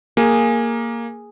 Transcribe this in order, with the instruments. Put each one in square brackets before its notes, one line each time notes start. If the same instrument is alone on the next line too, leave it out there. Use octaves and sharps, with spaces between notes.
[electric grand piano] A#3 [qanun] G#4